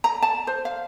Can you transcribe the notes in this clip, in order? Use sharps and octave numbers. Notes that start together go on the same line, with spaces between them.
A#5
A5
C5
F5